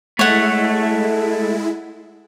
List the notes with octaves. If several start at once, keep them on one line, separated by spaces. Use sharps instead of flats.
G#3 A3 E4 C#5 F#5